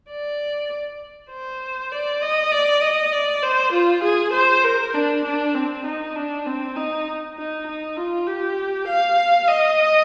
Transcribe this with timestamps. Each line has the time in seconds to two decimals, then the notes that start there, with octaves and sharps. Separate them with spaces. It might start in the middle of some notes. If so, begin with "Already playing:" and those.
0.10 D5
1.31 C5
1.92 D5
2.22 D#5
2.52 D5
2.82 D#5
3.13 D5
3.43 C5
3.73 F4
4.04 G#4
4.34 C5
4.64 A#4
4.94 D4
5.25 D4
5.55 C4
5.85 D#4
6.16 D4
6.46 C4
6.76 D#4
7.37 D#4
7.67 D#4
7.97 F4
8.27 G4
8.88 F5
9.49 D#5